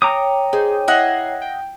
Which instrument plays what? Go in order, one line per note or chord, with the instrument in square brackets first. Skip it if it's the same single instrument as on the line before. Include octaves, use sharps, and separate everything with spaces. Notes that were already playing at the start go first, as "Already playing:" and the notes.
[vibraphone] C#5 G5 [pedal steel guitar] A#5 D6 D#6
[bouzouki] D#4 [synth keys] G#4 C5
[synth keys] E4 G#6 C7 [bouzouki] D#5 E5 F#5
[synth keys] G5